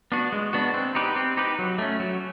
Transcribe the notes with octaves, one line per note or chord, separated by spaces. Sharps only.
B3 D4 F#4
G#3
B3 D4 F#4
C4
D#4 G4 B4
C4
D#4 G4 B4
F#3
A3 C#4
F#3